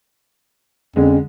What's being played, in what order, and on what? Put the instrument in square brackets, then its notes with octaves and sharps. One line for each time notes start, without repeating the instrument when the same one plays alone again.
[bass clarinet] F2 [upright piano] D3 G#3 [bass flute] C#4